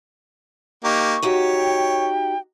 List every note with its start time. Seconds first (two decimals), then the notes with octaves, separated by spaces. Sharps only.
0.84 A#3 D#4 G4 C#6
1.22 D#4 F#4 G4 C#5
1.57 G5